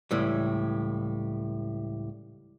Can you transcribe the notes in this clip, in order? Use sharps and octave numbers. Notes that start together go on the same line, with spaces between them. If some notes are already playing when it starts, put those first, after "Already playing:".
C#2 A2 E3 G3